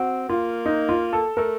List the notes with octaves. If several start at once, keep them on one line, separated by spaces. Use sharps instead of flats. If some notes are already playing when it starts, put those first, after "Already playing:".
Already playing: C4 F#4
A#3 F4
D#4
F4
A4
A3 A#4